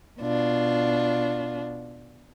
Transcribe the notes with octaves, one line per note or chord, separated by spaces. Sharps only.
B2 D4 F4